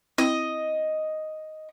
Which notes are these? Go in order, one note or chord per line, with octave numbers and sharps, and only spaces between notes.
C4 E4 D#5